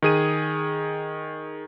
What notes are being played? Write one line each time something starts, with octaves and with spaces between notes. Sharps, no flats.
D#3 G#4 D#7